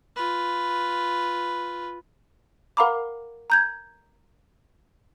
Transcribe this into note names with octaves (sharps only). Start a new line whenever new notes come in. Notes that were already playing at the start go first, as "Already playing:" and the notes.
F4 B4
A#4 F5 F#5 A#5 B5 D6
A#5 G6 G#6